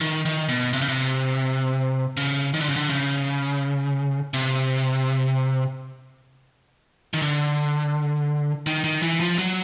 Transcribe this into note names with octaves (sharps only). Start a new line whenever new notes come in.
D#3
D#3
B2
C3
C#3
C3
C#3
D#3
D3
C#3
D3
C#3
C3
D#3
D3
D#3
D#3
E3
F3
F#3